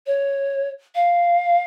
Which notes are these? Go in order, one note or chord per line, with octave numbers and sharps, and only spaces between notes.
C#5
F5